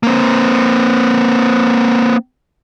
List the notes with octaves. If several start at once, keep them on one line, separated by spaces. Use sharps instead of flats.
A#3 C4